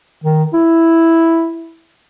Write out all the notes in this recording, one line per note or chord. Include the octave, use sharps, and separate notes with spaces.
D#3
E4